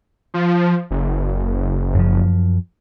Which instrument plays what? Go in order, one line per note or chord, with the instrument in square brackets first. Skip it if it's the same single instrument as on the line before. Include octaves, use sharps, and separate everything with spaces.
[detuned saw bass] F3
F#1
[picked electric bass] F#2 F3